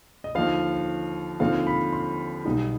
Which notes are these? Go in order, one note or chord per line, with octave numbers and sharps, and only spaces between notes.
D#5
D#2 D3 F3 F5
D#2 D3 F3 C4 F5
B5
C6
B1 B2 G3 B3 D#4